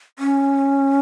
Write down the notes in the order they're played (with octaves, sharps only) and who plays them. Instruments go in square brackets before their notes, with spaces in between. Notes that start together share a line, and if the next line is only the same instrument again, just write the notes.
[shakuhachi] C#4